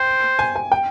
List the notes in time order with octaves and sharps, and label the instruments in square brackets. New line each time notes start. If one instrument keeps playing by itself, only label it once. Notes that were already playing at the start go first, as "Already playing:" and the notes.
Already playing: [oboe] C5 [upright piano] G5
[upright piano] G#5
G#5
G5